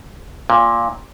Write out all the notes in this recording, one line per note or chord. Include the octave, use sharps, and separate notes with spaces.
A#2